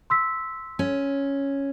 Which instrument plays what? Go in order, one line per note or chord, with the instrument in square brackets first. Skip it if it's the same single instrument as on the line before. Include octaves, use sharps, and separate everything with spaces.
[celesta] C6 E6 B6
[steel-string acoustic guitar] C#4